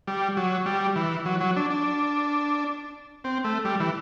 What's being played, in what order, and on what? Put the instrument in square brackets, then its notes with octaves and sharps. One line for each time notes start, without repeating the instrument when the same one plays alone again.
[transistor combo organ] G3
F#3
G3
E3
F#3
F#3
D4
D4
C4
A3
G3
E3